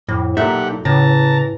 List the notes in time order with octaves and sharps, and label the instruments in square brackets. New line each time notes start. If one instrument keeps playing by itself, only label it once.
[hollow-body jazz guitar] F2 [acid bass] A2
[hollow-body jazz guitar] B1 E5 [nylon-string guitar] A#2 A#3 A4 [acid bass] D#4 [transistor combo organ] G4 F#5
[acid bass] A2 [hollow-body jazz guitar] C#3 [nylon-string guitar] E3 [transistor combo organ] A5 A#5